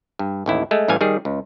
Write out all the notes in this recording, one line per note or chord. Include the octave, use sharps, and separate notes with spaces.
G2
A1 D#2 E4
G#3 A3
A1 E3 G3 F5 G#5
D#3 G3 G#4
C#2